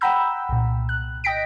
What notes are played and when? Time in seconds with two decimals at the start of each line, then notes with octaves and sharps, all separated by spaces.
0.01 F#5 G5 A#5 B5 E6 G6
0.49 C2 A#2
0.89 F#6
1.24 D#5 G5 A#6 B6 D7